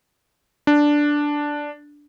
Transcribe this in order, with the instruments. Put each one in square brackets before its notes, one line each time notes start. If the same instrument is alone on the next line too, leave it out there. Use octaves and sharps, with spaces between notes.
[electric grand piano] D4